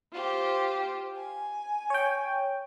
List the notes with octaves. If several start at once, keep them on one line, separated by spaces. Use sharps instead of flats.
F4 G4 C5
G#5
C#5 G5